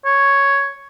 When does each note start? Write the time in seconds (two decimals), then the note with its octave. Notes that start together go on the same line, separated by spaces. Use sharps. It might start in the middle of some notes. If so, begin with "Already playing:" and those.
0.05 C#5